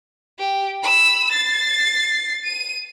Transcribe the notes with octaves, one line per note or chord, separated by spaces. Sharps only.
G4
B5 E6
A6 C7
D#7